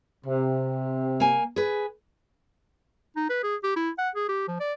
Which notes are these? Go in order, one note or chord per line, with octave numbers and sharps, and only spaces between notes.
C3
A#3 G#5
G#4 B4
D#4
B4
G#4
G4
E4
F#5
G#4
G4
F3
D5